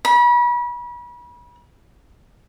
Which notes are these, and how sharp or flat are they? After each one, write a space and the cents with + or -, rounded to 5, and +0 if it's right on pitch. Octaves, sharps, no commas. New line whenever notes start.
B5 -35